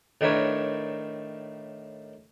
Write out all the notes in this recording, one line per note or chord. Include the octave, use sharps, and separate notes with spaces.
A2 D#3 D4 A#4 B4 C#5